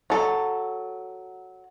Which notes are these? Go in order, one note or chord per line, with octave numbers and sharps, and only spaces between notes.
F#3 A4